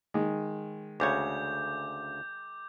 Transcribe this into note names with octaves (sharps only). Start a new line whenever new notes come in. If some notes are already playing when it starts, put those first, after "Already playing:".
D#3 G#3
D2 C#3 C#5 D6 G6